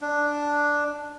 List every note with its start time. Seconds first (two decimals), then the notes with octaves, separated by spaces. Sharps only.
0.01 D4